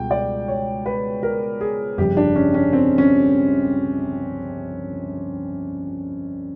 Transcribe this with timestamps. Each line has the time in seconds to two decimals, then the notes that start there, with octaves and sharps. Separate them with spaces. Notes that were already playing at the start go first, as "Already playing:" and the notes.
Already playing: C#2 B2 G3 G5
0.11 D5
0.48 C#5
0.86 B4
1.23 A#4
1.61 G#4
1.98 G1 F2 C#3 G4
2.17 D4
2.35 C#4
2.54 C#4
2.73 C4
2.98 C#4